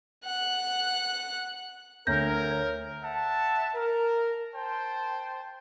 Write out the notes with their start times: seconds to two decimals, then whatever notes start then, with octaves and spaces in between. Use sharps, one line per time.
0.25 F#5 F#6
2.07 D2 A#4 C#5 G6 A#6
3.03 E5 F#5 A5
3.75 A#4
4.55 C5 G5 A5